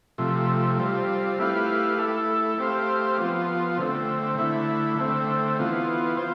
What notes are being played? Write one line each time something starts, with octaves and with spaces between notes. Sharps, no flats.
C3 F3 A3
G3 C4 F4
A3 E4 G4 B4 F5
A3 E4 A4
A3 C4 G4 C5 F5
F3 B3 F4
D3 A3 C4
D3 A3 E4
D3 A3 C4
E3 B3 F4
F4 C5